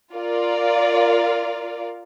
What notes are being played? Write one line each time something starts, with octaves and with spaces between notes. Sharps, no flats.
F4 A#4 D5 F5